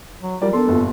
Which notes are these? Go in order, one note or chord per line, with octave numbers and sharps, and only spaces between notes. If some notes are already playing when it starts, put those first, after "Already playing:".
F#3
F3 G3 A#4 D5
B3 D4 A4 A#4 C6
G1 G2 A#2